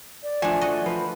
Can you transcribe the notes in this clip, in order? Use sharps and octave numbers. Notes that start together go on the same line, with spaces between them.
D5
F3 A3 D4 G#5
F#4 D#5
F3 B4